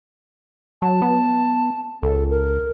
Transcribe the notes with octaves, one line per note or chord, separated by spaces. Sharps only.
F#3 A5
B3
C#2 A4
A#4